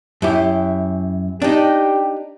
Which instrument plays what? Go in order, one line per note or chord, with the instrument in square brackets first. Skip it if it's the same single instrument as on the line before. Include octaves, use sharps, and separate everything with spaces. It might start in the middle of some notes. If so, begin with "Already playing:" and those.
[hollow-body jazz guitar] F#2 E4 G4
[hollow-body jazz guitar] D4 D#4 [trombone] G4